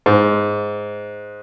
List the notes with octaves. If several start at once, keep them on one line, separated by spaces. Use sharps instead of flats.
G#2